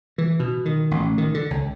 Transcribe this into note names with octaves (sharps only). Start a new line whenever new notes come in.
E3
B2
D#3
A1
D#3
D3
C#2